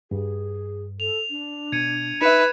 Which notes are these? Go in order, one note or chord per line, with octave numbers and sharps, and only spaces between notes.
G2 G#4
A4 F7
D4
B2 G#6 C#7 D#7
D#4 B4 E5 C#7 E7